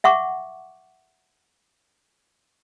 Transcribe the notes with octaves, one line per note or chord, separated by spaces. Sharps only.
E5 F#5 C#6 D6